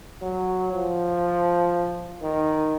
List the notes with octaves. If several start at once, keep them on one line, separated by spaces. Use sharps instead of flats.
F#3
F3
D#3